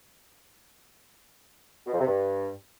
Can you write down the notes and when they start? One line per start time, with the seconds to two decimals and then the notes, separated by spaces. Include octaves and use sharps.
1.86 B2
1.93 F2
2.00 C3
2.07 G2